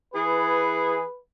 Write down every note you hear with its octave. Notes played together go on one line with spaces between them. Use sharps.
E3 G#4 B4